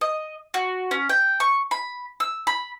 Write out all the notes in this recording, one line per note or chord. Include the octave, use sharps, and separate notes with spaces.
D#5
F#4
C#4
G5
C#6
B5
E6
B5